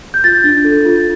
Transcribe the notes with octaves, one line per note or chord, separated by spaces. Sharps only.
G6
F4 A6
D4
A4
F4